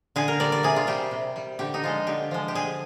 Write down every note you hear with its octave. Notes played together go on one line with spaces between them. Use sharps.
D3 G#4
A#4
G3 D5
D5
C3 G#4
F4
G3 G4
C3
G3
D3 G4
D#4
F3 G#3 F4
D3 G4
F3 G#3
G4
D3 G#4